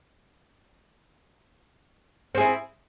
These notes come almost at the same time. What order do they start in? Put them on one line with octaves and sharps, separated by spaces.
C4 G#4 E4